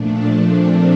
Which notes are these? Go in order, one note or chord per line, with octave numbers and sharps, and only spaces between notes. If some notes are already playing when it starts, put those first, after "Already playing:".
Already playing: A#2 F3 A3 D4
C4